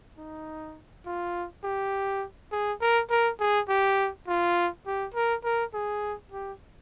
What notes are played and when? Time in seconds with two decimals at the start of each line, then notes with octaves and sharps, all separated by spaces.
0.18 D#4
1.06 F4
1.64 G4
2.52 G#4
2.81 A#4
3.10 A#4
3.40 G#4
3.69 G4
4.28 F4
4.86 G4
5.14 A#4
5.44 A#4
5.74 G#4
6.32 G4